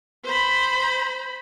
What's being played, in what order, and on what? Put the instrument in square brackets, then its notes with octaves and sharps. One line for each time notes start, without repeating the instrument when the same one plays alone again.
[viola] C5 B5